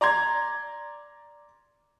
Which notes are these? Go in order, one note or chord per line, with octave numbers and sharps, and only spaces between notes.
D5 A#5 C6 G#6